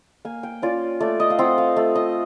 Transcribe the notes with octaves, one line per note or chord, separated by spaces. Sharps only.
A#3 G#5
G5
C#4 F4 D5
A3 D5
D#5
F5
C4 F4 F#5
F5
A3
D#5